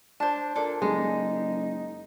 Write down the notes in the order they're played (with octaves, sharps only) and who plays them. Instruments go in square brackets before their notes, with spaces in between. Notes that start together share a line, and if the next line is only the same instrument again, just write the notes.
[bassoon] D4 [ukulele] C5 A5
[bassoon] A#2 [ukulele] D4 A4
[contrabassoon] F#1 [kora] G#3 [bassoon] D#4